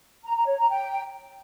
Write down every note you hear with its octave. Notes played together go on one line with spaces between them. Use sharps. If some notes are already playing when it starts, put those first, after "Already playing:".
A#5
A#5
C#5
A#5
G5